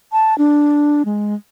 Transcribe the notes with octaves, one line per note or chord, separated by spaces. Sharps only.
A5
D4
G#3